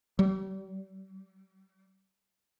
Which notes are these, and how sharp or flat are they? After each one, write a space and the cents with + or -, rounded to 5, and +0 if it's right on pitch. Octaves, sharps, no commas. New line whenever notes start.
G3 -40